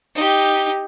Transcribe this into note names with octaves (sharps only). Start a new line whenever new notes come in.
D#4 G4